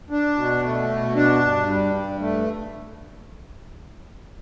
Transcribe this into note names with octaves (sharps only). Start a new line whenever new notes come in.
D4
B2
A3
B2
D4
G2
G3
G2
A3